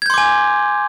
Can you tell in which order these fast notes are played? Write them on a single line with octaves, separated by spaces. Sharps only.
G#6 G6 C6 D6 G#5